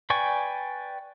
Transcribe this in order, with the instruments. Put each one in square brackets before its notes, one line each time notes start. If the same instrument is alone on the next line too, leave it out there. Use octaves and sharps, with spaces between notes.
[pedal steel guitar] B4 D5 G5 G#5 C#6